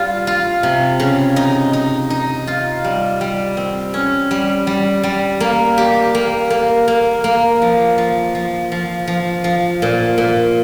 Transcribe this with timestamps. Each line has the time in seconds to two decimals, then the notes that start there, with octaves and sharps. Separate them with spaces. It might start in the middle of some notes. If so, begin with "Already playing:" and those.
Already playing: G3 F4
0.27 F4
0.63 C3
1.00 C#3
1.36 D#4
1.73 D#4
2.10 D#4
2.47 F4
2.84 G3
3.21 G3
3.57 C4
3.94 C#4
4.31 G3
4.67 G3
5.03 G3
5.40 A#3
5.78 G4
6.15 A#3
6.50 A#3
6.88 A#3
7.24 A#3
7.62 F3
7.98 F3
8.35 F3
8.72 F3
9.07 F3
9.44 F3
9.82 A#2
10.18 A#2